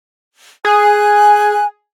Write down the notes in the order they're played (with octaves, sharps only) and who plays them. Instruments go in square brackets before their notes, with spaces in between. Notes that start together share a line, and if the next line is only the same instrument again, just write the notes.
[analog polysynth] G#4 [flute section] G#5 F#6